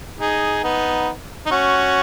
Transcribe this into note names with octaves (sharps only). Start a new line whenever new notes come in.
D#4 G#4
B3 D#4
D#4
C#4 F#4